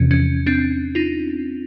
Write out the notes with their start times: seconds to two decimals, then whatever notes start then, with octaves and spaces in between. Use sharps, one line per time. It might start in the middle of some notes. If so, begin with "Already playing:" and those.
Already playing: E2 C3 F3 C#4
0.11 C#4
0.46 C4 D4
0.95 D#4 F4